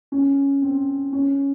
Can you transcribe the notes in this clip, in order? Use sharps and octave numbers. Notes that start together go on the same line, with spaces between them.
C#4
C4
C#4